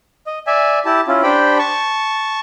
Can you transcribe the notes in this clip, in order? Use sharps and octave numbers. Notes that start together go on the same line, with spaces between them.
D#5
D5 E5 G#5
E4 G4 A5
C#4 E4 F4
D4 G4 C5 G5 B5
A5 C#6